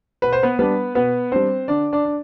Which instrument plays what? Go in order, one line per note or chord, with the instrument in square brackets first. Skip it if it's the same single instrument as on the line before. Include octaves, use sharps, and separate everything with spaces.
[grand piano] B2 B4
C5
B3 B4
G3 B3 D4 B4
B2 B3 B4
G3 C4 D4 C5
D3 D4 D5
D4 D5
D4